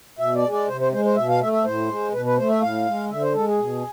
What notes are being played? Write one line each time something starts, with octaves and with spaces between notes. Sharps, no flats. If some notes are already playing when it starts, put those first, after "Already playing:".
B2 E5
D5
G#3
D5
C3 C5
C5
G#3 C5
C5
B2 E5
F5
A3 E5
E5
A2 C5
G#3
B2 B4
B4
A3 C5
E5
A2 F5
G#3
D3 E5
C5
G#3 A4
G#4
B2